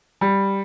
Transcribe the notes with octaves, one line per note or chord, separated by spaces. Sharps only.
G3